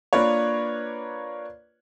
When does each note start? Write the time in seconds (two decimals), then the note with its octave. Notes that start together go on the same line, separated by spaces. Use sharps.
0.13 A#3 D4 F4 B4 C#5